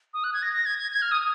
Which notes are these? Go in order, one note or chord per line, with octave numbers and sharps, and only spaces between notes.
D#6
F#6
G#6
A#6
A#6
G#6
G#6
G#6
F6
D#6